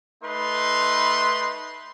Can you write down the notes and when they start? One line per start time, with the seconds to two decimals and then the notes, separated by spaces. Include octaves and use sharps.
0.23 A3 D#4 B4 C6